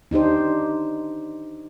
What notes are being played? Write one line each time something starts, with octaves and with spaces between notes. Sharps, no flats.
D4 D#4 G4 C5